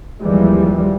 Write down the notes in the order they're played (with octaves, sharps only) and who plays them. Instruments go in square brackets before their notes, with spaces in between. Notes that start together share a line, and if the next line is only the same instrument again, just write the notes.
[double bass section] D#2 E3 F3 G3 G#3